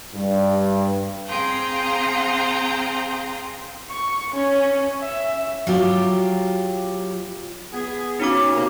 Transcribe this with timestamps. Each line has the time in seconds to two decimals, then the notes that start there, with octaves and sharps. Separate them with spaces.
0.14 G2
1.28 C4 G#4 F5 G5 A#5 C6
3.90 C#6
4.34 C#4
5.00 E5
5.67 F#3 F4 G4
7.73 B3 G#4
8.20 B2 A#3 C#4 D#4 F#4 D6
8.54 C3 F3 A#3